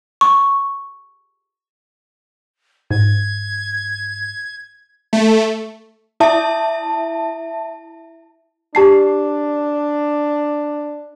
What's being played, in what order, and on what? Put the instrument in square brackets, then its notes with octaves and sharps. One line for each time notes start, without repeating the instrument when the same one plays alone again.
[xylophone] C#6
[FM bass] G#2 [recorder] G#6
[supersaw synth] A3
[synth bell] E4 E5 A5
[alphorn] D4 [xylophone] G4 A5 C7